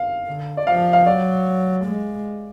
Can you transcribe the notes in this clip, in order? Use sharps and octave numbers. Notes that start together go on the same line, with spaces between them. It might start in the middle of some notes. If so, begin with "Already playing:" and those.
Already playing: F5
D3
D5
F3 F5
F5
F#3 D5
G#3